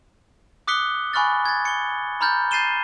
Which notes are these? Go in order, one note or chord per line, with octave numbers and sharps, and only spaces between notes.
D6 D#6 F#6 B6 C#7 G7
G#5 B5 C#6 F6 F#6 A6
G#6 A6
C#7 G7
A#5 B5 F6 G6 A6
G6 A6 C7 D#7 E7 G7